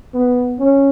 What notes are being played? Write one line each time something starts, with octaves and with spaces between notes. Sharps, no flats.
B3
C#4